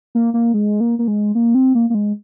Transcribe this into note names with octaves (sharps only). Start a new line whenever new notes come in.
A#3
A#3
G#3
A#3
A#3
G#3
A#3
C4
A#3
A#3
G#3